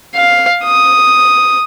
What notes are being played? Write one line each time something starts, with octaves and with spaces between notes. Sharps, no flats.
F5
D#6